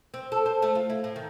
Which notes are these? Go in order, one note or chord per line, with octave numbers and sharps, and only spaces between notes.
C4
A4
C5
A3
F4
E4
A2
D#3